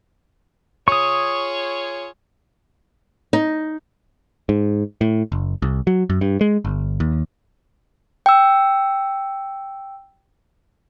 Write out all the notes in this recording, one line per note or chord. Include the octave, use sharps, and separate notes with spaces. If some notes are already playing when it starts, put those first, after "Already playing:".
F4 G#4 C#5 C#6 D#6
D#4
G#2
A2
F#1
C2
F#3
F#2
G2
G#3
G1
D#2
G5 E6